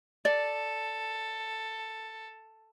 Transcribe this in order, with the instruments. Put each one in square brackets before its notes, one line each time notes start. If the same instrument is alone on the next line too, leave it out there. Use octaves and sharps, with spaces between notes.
[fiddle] A4 [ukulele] D5